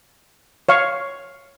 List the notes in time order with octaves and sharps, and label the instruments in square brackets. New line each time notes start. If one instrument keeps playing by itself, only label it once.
[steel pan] C#5 F5 C#6